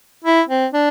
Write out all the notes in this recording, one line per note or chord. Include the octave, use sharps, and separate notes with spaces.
E4
C4
D4